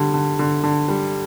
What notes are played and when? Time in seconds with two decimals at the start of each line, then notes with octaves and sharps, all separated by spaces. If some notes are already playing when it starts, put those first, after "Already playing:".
Already playing: D3 G3
0.14 D3
0.39 D3
0.64 D3
0.88 G3